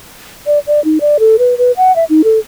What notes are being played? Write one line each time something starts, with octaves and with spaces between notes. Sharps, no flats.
D5
D5
D#4
D5
A4
B4
B4
F#5
E5
D#4
A4